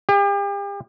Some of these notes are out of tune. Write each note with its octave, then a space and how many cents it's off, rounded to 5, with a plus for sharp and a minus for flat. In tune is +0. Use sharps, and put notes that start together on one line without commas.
G4 +40